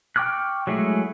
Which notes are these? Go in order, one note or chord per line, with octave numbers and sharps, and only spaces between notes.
G5 C#6 D6 F6 F#6
F#3 G#3 A3 E4 G#4